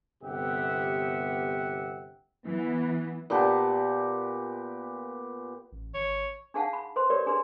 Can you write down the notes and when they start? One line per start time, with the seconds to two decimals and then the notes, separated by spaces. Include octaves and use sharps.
0.22 G1 C3 B3 G4 E5 F#5
2.46 E3 B3
3.30 A#2 B3 G4 A5
5.72 A1
5.94 G#1 C#5
6.54 D4 D#4 G#4 F5 F#5 A5
6.73 B5
6.96 B4 C5 C6
7.10 G4 A#4 B4 C#5 D5
7.26 D4 G#4 B4 C6